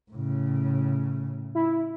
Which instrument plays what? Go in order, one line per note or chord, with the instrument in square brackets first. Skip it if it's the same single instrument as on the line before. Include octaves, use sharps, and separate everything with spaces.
[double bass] A2 C#3
[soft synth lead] E4